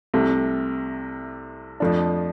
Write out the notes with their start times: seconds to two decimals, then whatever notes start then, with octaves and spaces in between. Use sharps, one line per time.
0.14 C2 C3 A3
1.80 F2 F3 A3 D4